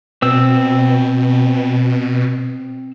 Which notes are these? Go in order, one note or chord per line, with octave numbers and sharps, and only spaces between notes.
B2 C4 E6